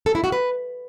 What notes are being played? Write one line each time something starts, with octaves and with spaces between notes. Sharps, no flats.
A4
E4
F#4
B4